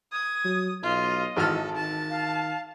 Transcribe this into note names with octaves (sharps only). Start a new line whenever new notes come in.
D#6 G#6
F#3
B1 F4 D#5
G#1 E3 A4 F6
D#3 A5
F5